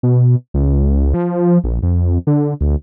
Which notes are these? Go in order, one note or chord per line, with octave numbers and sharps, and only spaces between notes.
B2
C#2
F3
A#1
F2
D3
D2